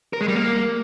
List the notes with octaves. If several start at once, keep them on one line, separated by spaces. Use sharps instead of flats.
A#4
G#3
G3
A#3